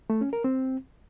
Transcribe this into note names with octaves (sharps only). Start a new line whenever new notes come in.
A3
C#4
A#4
C4